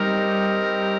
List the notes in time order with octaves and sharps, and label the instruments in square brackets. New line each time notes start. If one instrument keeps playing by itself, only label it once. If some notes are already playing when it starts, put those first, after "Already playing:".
Already playing: [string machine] G3 [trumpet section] C4 D#4 G4 A#4